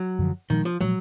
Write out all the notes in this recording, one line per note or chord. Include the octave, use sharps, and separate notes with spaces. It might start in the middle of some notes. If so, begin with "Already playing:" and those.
Already playing: F#3
F#2 D3 F3
A#2 D#3 F3 G#3
F3
A#2 F3 F#3 G#3